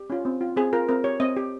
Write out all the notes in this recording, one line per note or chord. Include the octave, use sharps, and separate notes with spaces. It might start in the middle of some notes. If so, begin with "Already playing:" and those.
Already playing: G4
C#4 F4
C4
F4
C4 G#4
F4 A#4
C4 A#4
G4 C#5
C4 D#5
G4